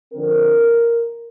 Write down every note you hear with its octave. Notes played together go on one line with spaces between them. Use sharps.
D3 F3 C4 A#4